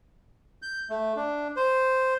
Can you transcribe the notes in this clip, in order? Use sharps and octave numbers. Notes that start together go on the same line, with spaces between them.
G6
A3
D4
C5